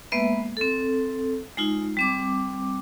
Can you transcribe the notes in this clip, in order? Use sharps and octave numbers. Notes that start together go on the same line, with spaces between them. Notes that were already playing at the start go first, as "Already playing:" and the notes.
G#3 A#3 B3 B4 E5
C4 A4
G#3 D#4 F4
G3 C4 D6